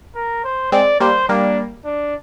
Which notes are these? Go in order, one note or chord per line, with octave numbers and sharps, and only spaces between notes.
A#4
C5
G#3 C4 D5
G3 A#3 C5
G3 A#3 D4
D4